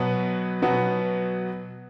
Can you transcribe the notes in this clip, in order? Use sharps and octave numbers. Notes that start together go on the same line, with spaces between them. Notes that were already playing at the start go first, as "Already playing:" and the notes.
Already playing: B2 F#3 B3 B4
B2 F#3 B3